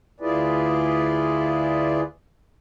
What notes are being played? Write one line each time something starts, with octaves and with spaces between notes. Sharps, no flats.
D2 E4 F4 G#4 B4 D5